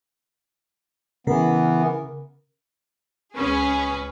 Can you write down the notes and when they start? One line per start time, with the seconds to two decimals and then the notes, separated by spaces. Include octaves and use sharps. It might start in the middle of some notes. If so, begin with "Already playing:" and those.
1.27 C#3 E3 B3 A#4
3.35 C#2 C#4 G#4 B4